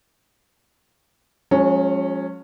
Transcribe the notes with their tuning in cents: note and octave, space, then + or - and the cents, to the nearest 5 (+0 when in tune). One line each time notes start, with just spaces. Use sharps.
F3 +45 G#3 +0 C#4 +0